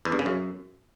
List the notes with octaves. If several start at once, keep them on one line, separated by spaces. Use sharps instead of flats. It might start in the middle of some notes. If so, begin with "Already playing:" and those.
E2
G2
C#3
F#2